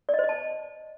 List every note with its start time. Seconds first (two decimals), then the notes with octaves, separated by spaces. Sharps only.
0.09 D5
0.14 D#5
0.19 C5
0.24 D#5
0.29 A5